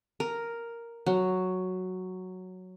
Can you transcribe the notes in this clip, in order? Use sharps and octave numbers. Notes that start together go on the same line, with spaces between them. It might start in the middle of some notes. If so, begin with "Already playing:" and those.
A#4
F#3